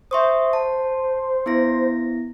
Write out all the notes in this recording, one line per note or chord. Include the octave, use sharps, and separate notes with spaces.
C5 E5 C#6 D#6
A5
B3 E4 A#6